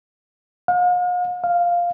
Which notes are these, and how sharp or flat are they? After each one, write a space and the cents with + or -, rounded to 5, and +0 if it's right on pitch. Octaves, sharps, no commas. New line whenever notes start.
F5 +45
F5 +0